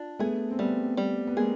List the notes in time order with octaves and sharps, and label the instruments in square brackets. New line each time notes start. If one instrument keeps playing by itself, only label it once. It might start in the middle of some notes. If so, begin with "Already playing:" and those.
Already playing: [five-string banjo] D4 F4
[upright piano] A3 B3 [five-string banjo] G#4
[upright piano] C4
[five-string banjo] G3 [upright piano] A3 B3
[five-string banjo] G3
[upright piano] B3
[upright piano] G#3 A#3 [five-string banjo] G#4